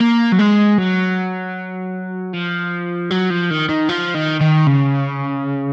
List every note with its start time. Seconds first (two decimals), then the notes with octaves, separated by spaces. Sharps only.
0.01 A#3
0.32 F#3
0.39 G#3
0.78 F#3
2.34 F3
3.11 F#3
3.30 F3
3.51 D#3
3.69 D#3
3.89 F3
4.15 D#3
4.41 D#3
4.67 C#3